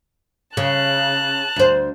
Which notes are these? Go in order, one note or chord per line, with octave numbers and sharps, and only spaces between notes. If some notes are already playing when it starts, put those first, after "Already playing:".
C#3 A5 F#6
D2 C5